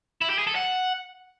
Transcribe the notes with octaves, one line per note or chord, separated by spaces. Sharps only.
E4
G4
G#4
A4
F#5